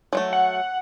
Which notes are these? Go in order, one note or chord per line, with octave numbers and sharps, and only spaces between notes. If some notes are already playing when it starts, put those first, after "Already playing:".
F#3 G#3 A3
F#5